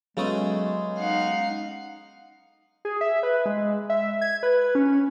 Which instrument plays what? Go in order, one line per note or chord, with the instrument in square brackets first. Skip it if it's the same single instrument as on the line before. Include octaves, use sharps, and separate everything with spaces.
[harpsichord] C#3 A3 D#6 [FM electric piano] F#3 B3 C#4 [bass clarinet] G#3
[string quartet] D#4 F5 F#5
[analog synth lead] G#4
E5
B4
G#3
E5
G#6
B4
C#4